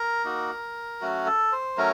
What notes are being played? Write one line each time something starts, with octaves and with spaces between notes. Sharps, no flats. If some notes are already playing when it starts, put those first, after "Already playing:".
Already playing: A#4
A#3 D#4 F#4
F#3 A3 C#4 F#4
A4
C5
F#3 A3 C#4 A#4